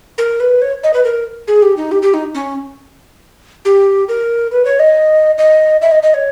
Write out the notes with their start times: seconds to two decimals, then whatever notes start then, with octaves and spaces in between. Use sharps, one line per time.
0.18 A#4
0.40 B4
0.62 C#5
0.83 D#5
0.93 B4
1.04 A#4
1.48 G#4
1.62 G4
1.77 D#4
1.91 G4
2.02 G4
2.14 D#4
2.35 C#4
3.65 G4
4.08 A#4
4.51 B4
4.65 C#5
4.79 D#5
5.38 D#5
5.81 E5
5.91 D#5
6.03 D#5
6.14 C#5